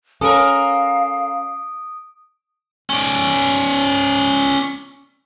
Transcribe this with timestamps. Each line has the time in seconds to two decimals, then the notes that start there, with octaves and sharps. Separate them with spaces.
0.21 C#4 A4 A#4 F5 D#6 D7
2.90 C#4 D5